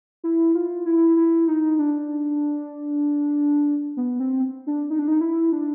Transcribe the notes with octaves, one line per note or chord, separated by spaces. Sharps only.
E4
F4
E4
E4
D#4
D4
B3
C4
D4
D#4
D4
D#4
E4
D4